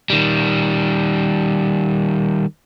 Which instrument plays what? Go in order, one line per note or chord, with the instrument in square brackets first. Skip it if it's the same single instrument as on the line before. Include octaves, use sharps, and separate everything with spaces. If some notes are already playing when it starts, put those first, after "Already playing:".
[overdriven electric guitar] D#3 G3